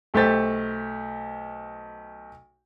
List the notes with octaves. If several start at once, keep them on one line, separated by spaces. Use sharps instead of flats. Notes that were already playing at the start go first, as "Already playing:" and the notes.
B1 A3 G4 C5 A6 B6